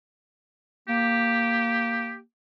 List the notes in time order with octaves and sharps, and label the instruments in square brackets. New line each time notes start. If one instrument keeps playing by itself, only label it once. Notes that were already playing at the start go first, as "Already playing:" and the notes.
[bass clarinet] A#3 [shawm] G4